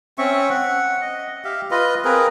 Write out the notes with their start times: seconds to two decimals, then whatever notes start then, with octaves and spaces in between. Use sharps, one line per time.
0.18 C4 C#4 E5 C#6
0.50 F#5
1.01 D#5
1.44 G4 E5 F5
1.71 F4 B4 D#5
2.05 C4 G#4 A#4 B4